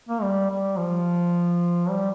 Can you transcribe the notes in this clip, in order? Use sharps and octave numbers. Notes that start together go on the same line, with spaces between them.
A#3
G3
G3
F3
G3